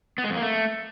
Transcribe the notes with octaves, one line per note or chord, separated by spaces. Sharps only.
B3
G#3
F2
A#3
A3